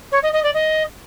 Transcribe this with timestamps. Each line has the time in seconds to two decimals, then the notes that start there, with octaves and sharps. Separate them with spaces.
0.12 C#5
0.23 D#5
0.33 D#5
0.43 D5
0.54 D#5